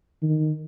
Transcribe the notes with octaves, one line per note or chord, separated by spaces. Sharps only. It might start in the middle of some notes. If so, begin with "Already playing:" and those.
D#3